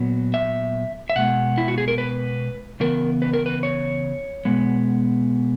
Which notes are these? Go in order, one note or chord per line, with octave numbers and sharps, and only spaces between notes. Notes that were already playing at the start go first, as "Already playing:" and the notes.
Already playing: A#2 F#3 B3
E5
E5
B2 G#3 B3 F#5
E4
F#4
G#4
A#4
B4
C#3 E3 B3 A#4
B4
A#4
B4
C#5
B2 G#3 B3